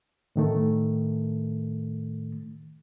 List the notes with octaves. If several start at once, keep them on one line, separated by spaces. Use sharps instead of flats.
A2 D#3 A3